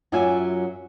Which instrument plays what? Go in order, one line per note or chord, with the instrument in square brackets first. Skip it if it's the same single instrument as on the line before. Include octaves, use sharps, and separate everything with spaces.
[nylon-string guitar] F#2 F#3 F4 D5 E5 G#5